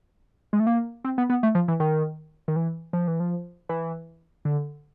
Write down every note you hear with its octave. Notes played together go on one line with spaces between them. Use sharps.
G#3
A3
A#3
C4
B3
B3
A3
F3
E3
D#3
D#3
E3
F3
E3
F3
E3
D3